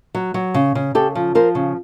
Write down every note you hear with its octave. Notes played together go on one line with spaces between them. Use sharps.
F#3
F#3
C#3
C#3
C#3 G4 A4
F3
F3 A#4 C5
C#3